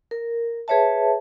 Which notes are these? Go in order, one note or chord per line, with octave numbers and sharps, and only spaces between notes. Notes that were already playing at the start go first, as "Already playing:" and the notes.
A#4
G#4 B4 C#5 E5 A5